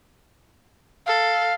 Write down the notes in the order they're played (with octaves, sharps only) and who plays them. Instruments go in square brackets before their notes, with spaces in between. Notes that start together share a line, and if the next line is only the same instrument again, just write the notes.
[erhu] A4 [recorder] F5